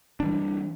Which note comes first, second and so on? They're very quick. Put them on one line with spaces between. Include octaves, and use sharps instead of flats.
D4 E3 G3